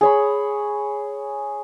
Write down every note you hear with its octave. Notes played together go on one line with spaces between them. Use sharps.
G#4 C#5 B5